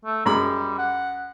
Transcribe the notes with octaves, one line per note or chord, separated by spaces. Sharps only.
A3
F#2 G3 G#3 B5
F#5